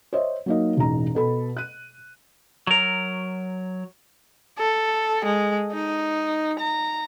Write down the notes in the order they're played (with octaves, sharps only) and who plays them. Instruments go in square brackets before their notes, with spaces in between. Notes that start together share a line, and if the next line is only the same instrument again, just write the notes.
[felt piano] C5 C#5 D#5 E5
F#3 A#3 D#4
E1 A1 D#4 A#5
B2 A4 B5
F#6 D#7
[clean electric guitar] F#3 A#4
[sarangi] A4
G#3
D#4
A#5